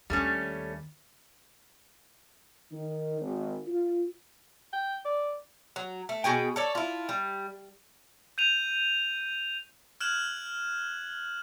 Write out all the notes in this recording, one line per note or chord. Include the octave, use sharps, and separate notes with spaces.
D#2 G3 A3 C#4
D#3
G#1
F4
G5
D5
F#3
A3
B2 F#4 G#4 G5
A4 C#5 D5
E4 F4
G3
G6 D#7 F7
F6 F#6 G#6 E7 F#7